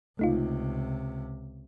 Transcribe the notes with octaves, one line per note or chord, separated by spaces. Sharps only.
C#2 C3 A3 D#4 F4